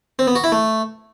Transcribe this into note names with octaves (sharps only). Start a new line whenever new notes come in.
C4
B3
F#4
E4
A3